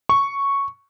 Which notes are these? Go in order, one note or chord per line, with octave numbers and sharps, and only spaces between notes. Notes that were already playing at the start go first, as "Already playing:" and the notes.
C#6